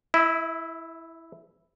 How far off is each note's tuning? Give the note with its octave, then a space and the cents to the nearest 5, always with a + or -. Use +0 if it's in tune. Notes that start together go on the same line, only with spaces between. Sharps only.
E4 +0 E5 -40